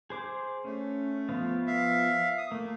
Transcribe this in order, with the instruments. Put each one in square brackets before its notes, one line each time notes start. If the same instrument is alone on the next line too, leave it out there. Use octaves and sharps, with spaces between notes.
[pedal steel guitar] G#4 C5 D6
[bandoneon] A3 [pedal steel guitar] C#4
[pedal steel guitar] F3 B3 F4
[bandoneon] E5 F5
D#6
[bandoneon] A3 [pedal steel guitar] A#3